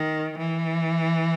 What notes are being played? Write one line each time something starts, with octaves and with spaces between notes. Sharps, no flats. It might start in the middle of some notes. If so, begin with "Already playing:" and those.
Already playing: D#3
E3